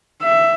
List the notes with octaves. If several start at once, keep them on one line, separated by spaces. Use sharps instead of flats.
E5